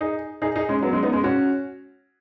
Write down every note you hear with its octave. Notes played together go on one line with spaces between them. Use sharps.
D#4 G#4
D#4 G#4
D#4 G#4
G#3 C#4
F#3 B3
G#3 C#4
B3 D#4
G#3 C#4
C#4 F#4